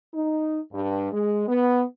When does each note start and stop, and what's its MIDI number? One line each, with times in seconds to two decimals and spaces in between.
0.14 0.60 63
0.72 1.10 43
1.12 1.48 56
1.48 1.85 59